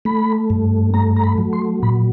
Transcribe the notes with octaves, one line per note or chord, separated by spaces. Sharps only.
A3 B5
G2
A3 A#5
A#5
B5
F#3
C6
A#2 B5